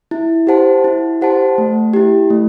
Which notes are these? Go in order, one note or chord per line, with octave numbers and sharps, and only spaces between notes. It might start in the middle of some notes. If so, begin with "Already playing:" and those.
E4
G4 C5 F#5 A5
E4
G4 C5 F#5 A5
A3
E4 G4
A3